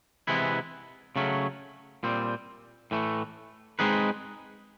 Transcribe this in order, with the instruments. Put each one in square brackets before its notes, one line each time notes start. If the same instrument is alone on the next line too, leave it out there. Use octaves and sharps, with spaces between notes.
[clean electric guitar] C3 E3 G#3 B3 E4
C#3 F#3 A3 C#4
A#2 G3 C4
A2 E3 A3
G#3 C4 D#4 G#4 B4